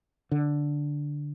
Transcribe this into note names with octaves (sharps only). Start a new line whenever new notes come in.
D3